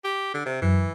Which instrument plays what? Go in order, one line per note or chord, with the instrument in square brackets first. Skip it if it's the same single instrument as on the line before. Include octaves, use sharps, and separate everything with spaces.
[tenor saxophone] G4
D3
C3
[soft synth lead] F#2 [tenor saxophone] E3